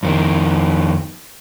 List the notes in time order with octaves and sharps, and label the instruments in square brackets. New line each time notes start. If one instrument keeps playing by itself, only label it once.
[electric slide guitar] F2 D#3